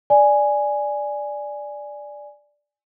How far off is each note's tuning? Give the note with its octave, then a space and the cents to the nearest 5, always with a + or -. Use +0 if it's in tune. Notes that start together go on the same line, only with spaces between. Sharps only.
D5 +0 G#5 +0